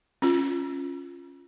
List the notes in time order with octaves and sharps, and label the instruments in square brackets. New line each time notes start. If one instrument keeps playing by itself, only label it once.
[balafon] C#4 F4